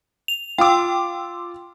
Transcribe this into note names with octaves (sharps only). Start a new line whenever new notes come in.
F7
F4 G5 C6 D6 E6